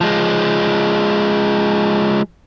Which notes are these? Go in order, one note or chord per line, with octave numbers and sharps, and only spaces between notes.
F3 G#3